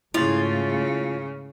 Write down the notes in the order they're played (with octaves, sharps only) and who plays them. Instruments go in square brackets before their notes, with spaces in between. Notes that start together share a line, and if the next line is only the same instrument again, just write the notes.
[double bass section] G#2 A3 [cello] C#3 [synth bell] E4 A6 [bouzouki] F4